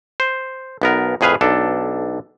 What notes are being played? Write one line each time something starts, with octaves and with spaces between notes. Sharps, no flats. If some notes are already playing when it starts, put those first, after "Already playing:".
C5
B1 B3 A#4
F2 A2 G#4 B4 F5 G#5
B1 D4 A4